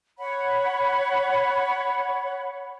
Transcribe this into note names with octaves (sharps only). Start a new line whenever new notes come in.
C#5 F#5 B5